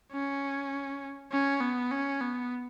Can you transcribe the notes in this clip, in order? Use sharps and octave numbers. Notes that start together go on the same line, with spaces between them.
C#4
C#4
B3
C#4
B3